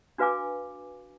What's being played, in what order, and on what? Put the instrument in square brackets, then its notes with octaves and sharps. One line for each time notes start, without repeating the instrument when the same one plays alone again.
[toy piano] D4 F#4 B4 F5 G#5 D6